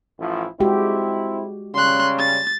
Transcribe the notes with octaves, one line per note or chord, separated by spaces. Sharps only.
A1 F3 E4
G#3 C4 E4 F#4 G4
C#3 G3 C#4 C6 F#6
A6